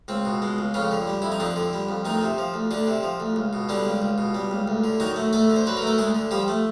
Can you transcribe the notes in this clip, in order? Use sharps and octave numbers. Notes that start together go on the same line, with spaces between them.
C#2 C4
B2
G#3
C#2
F2 C#3 C#4
D3
G3
F2 E4
D#4
F2 D3 D4
D3
G3
F2
D2 D#3 D#4
C3
F3
D2
D2 D3 D4
C3
F3
D2
C#2
B2
D3 G3 D4
C#2
C#2
B2
G3
C#2
D2
D3
D#3 F#3 D#4
A3
D2 A3 A4
D3
C5
F#3 B4
A3 A#4
A4
D2 G#3 G#4
D3
F3 G3 G4
A3